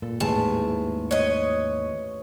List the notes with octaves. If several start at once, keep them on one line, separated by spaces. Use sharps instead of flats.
A#2 A4
A1 D#2 G#2 G#4 G#5 A5
C#5 D#5 F#6 B6